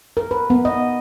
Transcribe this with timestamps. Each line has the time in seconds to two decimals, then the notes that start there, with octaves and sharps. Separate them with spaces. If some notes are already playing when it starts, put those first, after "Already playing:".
0.17 A#4
0.31 B4
0.50 B3
0.65 D#5